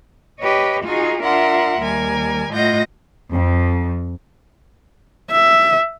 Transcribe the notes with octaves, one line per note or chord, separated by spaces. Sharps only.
G4 B4 C#5 D#5
D#4 F4 F#4 G#4
D4 F4 A#4 E5 F#5 C6
D#2 G3 A#4 G#5
A2 F4 D#5 F#5 G6 A#6
F2
E5